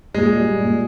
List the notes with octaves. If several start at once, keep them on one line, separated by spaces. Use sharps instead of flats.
A#2 G#3
G3
A#2